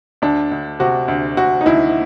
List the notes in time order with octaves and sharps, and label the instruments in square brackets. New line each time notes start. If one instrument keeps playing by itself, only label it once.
[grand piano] D2 D4
D2
C3 F#4
D2
D2 F#4
D#4
D2 E4